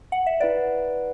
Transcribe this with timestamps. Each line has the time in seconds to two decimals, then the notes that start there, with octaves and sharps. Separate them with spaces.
0.12 F#5
0.26 E5
0.40 E4 B4 D5 F#5